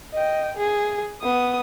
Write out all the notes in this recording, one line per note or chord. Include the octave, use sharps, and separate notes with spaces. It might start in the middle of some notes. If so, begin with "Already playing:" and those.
D#5 G5
G#4
B3 D#6